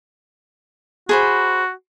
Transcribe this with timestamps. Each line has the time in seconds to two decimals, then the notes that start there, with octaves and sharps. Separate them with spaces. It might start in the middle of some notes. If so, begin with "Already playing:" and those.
1.09 F#4 G#4 C5 B5